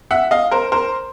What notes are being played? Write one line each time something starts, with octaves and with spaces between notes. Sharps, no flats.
E5 F#5
D#5 F5
A#4 C5
A#4 C5